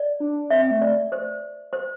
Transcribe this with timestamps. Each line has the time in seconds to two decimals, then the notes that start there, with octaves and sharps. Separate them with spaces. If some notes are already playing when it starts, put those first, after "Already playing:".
Already playing: D5
0.20 D4
0.50 C4 E5
0.71 A3
0.82 D5
1.12 C5
1.73 C5